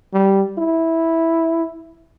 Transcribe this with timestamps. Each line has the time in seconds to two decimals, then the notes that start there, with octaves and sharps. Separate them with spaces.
0.13 G3
0.58 E4